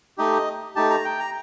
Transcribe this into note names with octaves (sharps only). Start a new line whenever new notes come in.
A3 D#4 G4 D#5
A3 D#4 G4 A5
A#5
G5
A#5